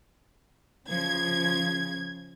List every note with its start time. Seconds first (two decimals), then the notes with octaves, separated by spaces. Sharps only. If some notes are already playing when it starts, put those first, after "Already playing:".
0.89 C#3 F3 G#6